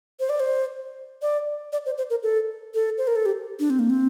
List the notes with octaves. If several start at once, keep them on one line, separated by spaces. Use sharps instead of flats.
C5
D5
C5
D5
D5
C5
C5
A#4
A4
A4
C5
A#4
A4
G4
D4
C4
A#3
C4